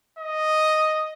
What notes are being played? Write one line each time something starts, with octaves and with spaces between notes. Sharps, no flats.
D#5